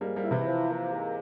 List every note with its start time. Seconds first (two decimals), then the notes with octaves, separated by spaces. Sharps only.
0.01 G#2 G3 A#3
0.16 G3 A#3
0.24 E4
0.31 C3 E3
0.46 F3
0.70 A#3
0.93 G#2